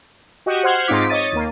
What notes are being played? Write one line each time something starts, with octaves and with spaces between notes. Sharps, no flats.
F#4 G4 D#5
C5 F#5 C6 F6 G#6
G#2 C4 D#4 F4 D6 B6
C#5 D#5 A6 D#7
D#2 A#3